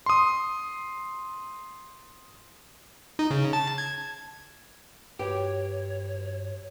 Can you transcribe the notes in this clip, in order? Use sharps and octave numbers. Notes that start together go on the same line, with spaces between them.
C6 D#6
D#4
C#3
A5
G#6
G2 F#4 G4 B4 C#5